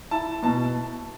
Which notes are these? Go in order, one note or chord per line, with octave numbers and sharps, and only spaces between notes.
E4 A5
B2 A5